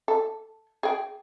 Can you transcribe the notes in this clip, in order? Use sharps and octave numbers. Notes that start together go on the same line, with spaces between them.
A4
G#4 G5